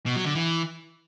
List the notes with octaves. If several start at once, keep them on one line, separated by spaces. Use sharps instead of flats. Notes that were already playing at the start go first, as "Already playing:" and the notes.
B2
F#3
D3
E3